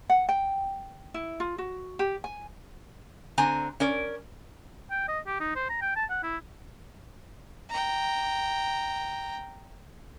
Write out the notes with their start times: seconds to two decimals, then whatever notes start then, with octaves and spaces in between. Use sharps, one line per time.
0.10 F#5
0.29 G5
1.14 E4
1.40 F4
1.58 F#4
1.99 G4
2.24 G#5
3.38 D3 C4 G#5 A#5
3.80 C#4 A#4 D5
4.91 G5
5.08 D#5
5.27 G4
5.40 D#4
5.55 C5
5.69 A#5
5.81 G5
5.96 A5
6.10 F#5
6.23 E4
7.70 G5 A#5